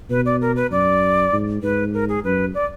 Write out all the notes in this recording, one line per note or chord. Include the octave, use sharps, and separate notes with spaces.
B2 B4
D5
A#4
B4
F#2 D5
G#2
G#2 B4
A#4
G#4
F#2 B4
D5